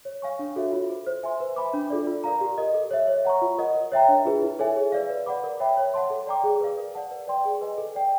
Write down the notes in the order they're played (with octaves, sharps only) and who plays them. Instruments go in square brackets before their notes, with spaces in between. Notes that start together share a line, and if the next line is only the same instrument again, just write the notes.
[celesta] C#5
F5 G#5 C#6
D4
F#4 A4 C#5 E5
F4
A4 C5
C5
E5 G#5 C6
B4
E5 G#5 B5 D6
D4
F4 A4 D5
F4
A#4 D5 F5 A#5
G4
A#4 D#5
A4
C#5 E5
C#5
F#5 A#5 C#6
F4
A#4 D#5 F#5
A#4
C#5 E5 G5 A#5
D4
F4 G#4 B4
E4
A4 C#5 E5 G#5
G#4
B4 D5 F5
B4
D5 F#5 B5 D6
A#4
C#5 E5 G5 B5
C#5
F#5 A5 C6
A4
D5 G5 A#5 D6
G#4
B4 D5 F5
A#4
D5 F#5 A5
B4
D5 G5 C6
G#4
B4 D#5 G#5
A4
D5 G5